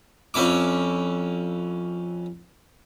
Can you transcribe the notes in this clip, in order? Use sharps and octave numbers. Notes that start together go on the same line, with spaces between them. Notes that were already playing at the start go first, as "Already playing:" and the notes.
F2 C#4 E4 D6